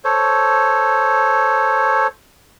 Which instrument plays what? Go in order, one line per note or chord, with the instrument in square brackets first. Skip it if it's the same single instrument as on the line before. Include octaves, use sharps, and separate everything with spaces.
[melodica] A4 C5 C#5